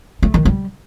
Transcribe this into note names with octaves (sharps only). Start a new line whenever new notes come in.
A3
D#3
G3